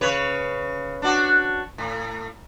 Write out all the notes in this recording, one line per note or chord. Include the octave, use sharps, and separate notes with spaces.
C#3 B4 C#5
D4 F#4
A2